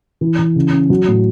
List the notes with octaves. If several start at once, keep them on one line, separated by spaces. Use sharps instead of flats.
E3
E3
C#3
C#4
F#3
A2